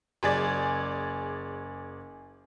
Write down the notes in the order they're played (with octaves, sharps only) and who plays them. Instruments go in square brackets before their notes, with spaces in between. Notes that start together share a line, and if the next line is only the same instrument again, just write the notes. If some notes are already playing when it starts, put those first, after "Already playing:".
[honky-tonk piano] F#1 G#4 D5